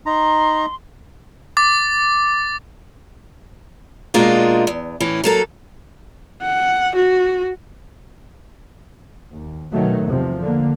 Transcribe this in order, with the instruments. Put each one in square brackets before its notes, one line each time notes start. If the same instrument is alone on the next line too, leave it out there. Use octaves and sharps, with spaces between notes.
[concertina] D#4 A#5 [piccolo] C6
[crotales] D6 A6
[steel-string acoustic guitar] B2 G#3 A#3 D4 D#4 F4
E2
A2 E3 C#4
F#3 A#3 A4
[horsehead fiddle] F#5
F#4
[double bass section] D#2
B2 D#3 F#3 A3
E2 C3 F3
D3 A#3